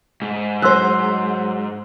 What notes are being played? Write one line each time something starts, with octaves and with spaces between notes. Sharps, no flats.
G#2
F#3 C5 C6 E6 F#6